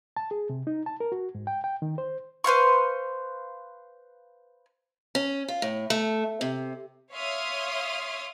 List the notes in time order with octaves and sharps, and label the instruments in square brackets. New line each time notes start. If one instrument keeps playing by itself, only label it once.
[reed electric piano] A5
G#4
C3
D#4
A5
A#4
F#4
G#2
G5
G5
D#3
C5
[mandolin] B4 C5 F5 C#6
[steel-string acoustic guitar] C#4
F4
A2
A3
C3
[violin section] C#5 E5 F5 C6 D#6 F6